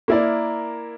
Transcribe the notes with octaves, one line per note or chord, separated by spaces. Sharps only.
A#3 E4 A#4 D5